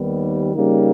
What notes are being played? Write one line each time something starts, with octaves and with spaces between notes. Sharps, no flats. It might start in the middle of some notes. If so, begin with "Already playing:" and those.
Already playing: D#2 D#3 G3 B3
C#3 G3 A#3 D#4